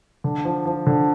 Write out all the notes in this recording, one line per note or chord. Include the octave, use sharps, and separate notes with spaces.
D3
F3
F3
D3